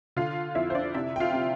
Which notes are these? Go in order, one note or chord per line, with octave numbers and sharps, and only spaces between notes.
D3 F4 F5
F2 E4 E5
C5
D4 D5
C3 E4 E5
G5
F4 F5
C3